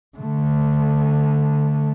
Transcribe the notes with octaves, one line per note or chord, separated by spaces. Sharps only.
D3 A3